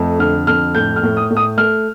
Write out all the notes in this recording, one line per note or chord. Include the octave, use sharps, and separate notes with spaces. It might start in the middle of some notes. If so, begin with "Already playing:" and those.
Already playing: F2 A3
D3 F6
F2 F6
A2 G6
F6
A2
D#6
A2
D#6
A3 F6